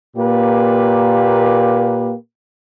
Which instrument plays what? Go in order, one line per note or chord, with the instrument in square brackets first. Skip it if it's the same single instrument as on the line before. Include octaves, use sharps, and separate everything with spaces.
[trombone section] A#2 A#3 G4 B4